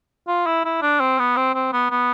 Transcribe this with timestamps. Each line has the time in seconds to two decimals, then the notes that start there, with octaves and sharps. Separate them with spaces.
0.28 F4
0.46 E4
0.65 E4
0.82 D4
1.00 C4
1.19 B3
1.36 C4
1.54 C4
1.73 B3
1.90 B3